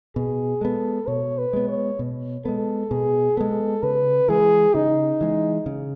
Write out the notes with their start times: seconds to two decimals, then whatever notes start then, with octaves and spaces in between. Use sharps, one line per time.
0.16 B2 G#4
0.61 G#3 B3 A4
1.07 B2 C#5
1.38 B4
1.53 G#3 B3
1.68 C#5
1.99 B2
2.45 G#3 B3 A4
2.91 B2 G#4
3.37 G#3 B3 A4
3.83 C#3 B4
4.28 E3 G#3 G#4
4.74 C#3 D#4
5.21 E3 G#3
5.66 C#3